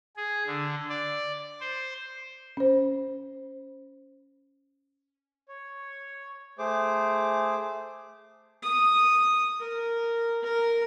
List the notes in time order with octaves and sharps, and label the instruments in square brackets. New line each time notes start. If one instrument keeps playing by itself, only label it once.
[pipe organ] G#4
D3
D5
C5
[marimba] C#4 C5
[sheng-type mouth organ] C#5
A3 G#4 C5 D6
[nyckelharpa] D#6
A#4
A#4